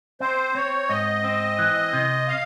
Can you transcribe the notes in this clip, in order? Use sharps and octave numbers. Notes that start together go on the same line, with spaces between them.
C4 C5
C4 C#5
G#2 D#5
C4
E3
C3
F5